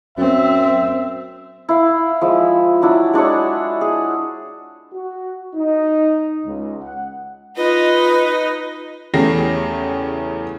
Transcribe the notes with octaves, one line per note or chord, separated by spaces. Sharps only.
F#2 C4 E5
E4 F5
F3 G#3 E4
F#3 D4 E4
G#3 D4 F#4 C#5
G#4
F#4
D#4
C#2
F#5
D#4 F4 B4 D#5
E2 C#3 A3 G4 A#6 C7